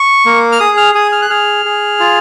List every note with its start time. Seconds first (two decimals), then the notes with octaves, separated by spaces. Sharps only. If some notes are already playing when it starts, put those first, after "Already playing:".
Already playing: C#6
0.26 A#3
0.52 F6
0.60 G#4 D#6
0.77 F6
0.95 G#4 D#6
1.12 F6
1.22 F#6
1.30 G#4 F6
1.65 G#4
2.00 F4